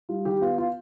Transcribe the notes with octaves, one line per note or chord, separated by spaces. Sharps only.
G3 F4
D#3 G4
B3 F4
F4